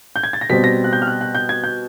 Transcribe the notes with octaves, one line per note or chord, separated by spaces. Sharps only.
G6
G#6
A6
A#6
B2 G3 C4 B6
A#6
F#6
G6
F6
F#6
F#6
G6
G#6
G6